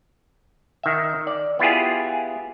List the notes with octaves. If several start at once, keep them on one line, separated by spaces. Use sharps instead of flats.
D#3 E5
D5
B3 E4 F4 G4 G#4